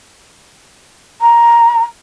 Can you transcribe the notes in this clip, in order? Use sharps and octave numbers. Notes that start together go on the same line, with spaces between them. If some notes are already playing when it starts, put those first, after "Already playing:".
A#5